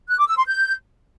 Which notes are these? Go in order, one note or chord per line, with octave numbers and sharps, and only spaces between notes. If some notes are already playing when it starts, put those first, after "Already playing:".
F#6
D6
E6
C6
G6